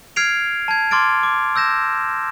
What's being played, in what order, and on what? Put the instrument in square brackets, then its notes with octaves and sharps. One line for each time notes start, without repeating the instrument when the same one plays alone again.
[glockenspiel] F6 G#6 C7 D7 F7
A5 G#6
C6 D6 F6 A6 D7
D6
E6 G6 A#6 E7